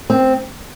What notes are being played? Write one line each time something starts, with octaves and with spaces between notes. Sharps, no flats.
C4